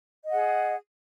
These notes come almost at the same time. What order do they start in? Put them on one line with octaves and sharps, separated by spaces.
D#5 F#5 G#4